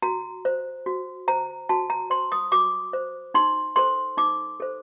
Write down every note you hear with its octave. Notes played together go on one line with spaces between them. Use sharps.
F#4 A#5
C5
F#4
C5 A#5
F#4 A5
A#5
C5 C6
D#6
F#4 D6
C5
D#4 C6
A4 C5 C6
D#4 D6
A4 C5